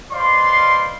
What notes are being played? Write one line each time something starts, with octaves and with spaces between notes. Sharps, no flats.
B4 C5 D5 D#5 F5 C6